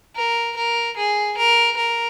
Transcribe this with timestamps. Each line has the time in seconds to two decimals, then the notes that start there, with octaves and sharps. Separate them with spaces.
0.16 A#4
0.56 A#4
0.96 G#4
1.37 A#4
1.77 A#4